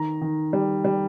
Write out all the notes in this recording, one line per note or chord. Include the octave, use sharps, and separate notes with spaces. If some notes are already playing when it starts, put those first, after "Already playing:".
Already playing: D#3 A#5
D#3
G3
G3